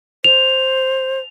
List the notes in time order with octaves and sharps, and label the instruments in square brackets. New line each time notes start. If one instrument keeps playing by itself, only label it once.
[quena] C5 [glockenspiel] F7